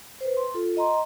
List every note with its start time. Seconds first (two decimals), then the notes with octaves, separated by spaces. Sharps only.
0.21 B4 C5
0.37 C6
0.54 F4 A4
0.77 D#5 A#5 C6